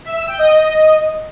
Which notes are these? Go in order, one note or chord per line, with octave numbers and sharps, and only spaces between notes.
E5
E6
G5
D#5